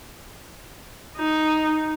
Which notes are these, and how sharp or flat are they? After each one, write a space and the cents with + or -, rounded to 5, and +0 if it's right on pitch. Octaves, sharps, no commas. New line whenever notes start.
D#4 +0